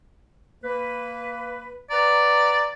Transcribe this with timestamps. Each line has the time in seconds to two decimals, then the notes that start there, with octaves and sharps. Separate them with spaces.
0.63 A#3 B4
1.90 B4 D5 F#5 A#5